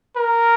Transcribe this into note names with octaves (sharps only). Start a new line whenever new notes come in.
A#4